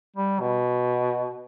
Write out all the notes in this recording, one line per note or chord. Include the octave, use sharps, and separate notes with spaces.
G3
B2